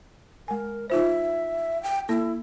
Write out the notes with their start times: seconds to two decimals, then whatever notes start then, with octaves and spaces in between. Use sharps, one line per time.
0.48 G#3 A#4 G#5
0.90 D#4 F4 C5 E5
1.83 G5
2.09 A#3 E4 A4